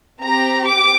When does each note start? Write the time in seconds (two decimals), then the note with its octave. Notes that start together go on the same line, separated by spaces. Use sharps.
0.21 C4 G4 A#5
0.67 D6